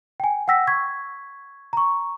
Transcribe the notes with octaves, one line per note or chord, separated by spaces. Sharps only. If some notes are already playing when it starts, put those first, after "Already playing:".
G5 G#5
F#5 G5 E6 A#6 B6
C#6 G#6 B6
A#5 C#6